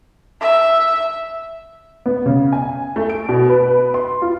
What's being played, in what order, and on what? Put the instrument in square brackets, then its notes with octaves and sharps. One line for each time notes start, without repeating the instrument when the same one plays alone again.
[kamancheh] E5
[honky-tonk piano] B3
C#3
G#5
A3
D7
B2
B4
C6
F4